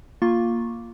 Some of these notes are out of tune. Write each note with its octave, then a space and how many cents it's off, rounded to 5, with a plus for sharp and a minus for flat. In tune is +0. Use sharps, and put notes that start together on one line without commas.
A#3 +0 F4 +0 C#6 -20